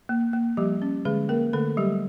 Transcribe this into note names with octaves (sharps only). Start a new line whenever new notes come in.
A#3
A#3
F3 G3 G4
C#4
D3 G#3 G#4
A#3 A#4
D3 A3 A4
F#3 G3 G4